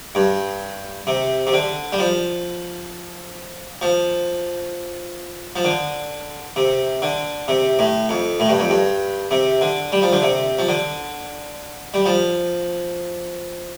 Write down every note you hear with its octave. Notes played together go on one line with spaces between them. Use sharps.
G2
C3
C3
D3
G3
F3
F3
F3
D3
C3
D3
C3
A2
F2
A2
G2
F2
G2
C3
D3
G3
F3
D3
C3
F3
D3
G3
F3